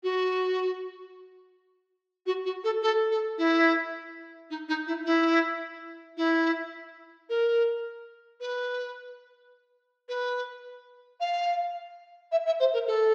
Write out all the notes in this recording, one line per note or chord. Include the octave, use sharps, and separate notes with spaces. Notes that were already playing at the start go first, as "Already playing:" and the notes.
F#4
F#4
F#4
A4
A4
A4
E4
D#4
D#4
E4
E4
E4
A#4
B4
B4
F5
E5
E5
C5
A#4
A4